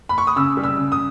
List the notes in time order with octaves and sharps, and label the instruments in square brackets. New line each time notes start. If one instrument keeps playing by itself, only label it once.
[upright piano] B5
C#6
D#6
C#3 E6
G3
E6
C#3
D#6